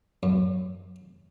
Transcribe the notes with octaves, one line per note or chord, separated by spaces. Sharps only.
F#2